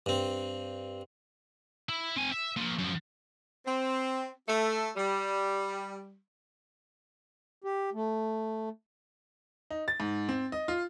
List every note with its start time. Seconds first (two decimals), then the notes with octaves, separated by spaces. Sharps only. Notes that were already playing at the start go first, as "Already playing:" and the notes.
0.06 G2 C4
1.89 E4
2.17 C4 G#5
2.32 E5
2.57 A#2 F3
2.79 F#2 F3
3.66 C4
4.47 A3
4.95 G3
7.64 G4
7.94 A3
9.70 D#4
9.88 A6
10.00 G#2
10.29 C4
10.52 D#5
10.68 F4